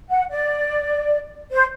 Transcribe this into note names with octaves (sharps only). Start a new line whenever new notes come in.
F#5
D5
C5